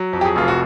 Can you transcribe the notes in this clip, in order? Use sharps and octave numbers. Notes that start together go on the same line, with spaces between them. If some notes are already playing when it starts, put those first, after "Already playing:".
Already playing: F#3
F2
G4
G#4
F1 F4
F#4